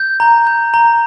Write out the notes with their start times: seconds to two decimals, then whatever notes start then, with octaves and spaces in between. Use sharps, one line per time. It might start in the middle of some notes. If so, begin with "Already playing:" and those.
Already playing: G6
0.20 A#5
0.47 G6
0.74 A#5